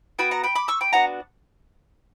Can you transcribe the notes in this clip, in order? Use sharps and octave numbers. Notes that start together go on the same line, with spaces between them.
B3 F#4 G5 B5
F#5 A#5
G5 B5
B5 D6
C#6 E6
G5 B5
B3 D4 F#4 F#5 A#5